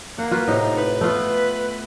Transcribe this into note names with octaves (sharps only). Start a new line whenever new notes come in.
A#3 F#5
F4 F#4 B4
A2 C3 D#4
B4
A3 B3 F4